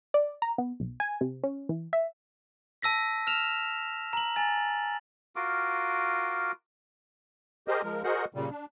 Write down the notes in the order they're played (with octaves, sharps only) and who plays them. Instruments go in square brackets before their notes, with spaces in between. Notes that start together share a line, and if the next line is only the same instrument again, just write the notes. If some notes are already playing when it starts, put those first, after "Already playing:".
[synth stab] D5
A#5
B3
B1
G#5
C3
C#4
E3
E5
[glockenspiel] A5 E6 A#6 B6
F6 E7 F7
A#5 F#7
G#5 A6
[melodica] F4 F#4 A#4 D6
[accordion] G4 G#4 A#4 C5 D#5
F3 G#3 A#4
F#4 G#4 A#4 C5 D#5 F#5
A#2 C#3 G3
D4